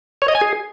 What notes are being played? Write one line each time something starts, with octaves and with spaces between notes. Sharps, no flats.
C#5
D#5
G#5
G#4